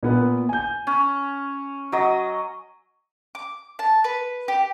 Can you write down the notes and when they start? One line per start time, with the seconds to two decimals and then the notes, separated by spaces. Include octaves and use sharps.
0.03 A#2 B3 B4
0.49 G#5 G6
0.87 C#4
1.92 F#3 D#5
3.35 D6
3.79 A5
4.04 B4
4.48 G4